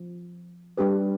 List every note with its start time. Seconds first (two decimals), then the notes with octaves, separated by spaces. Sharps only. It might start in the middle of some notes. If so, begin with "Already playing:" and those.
Already playing: F3
0.77 G3 D4 G4 B4